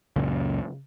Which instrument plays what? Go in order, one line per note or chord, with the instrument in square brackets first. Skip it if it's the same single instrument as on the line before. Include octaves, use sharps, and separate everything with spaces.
[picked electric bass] C#2 F#2 A#2 C#3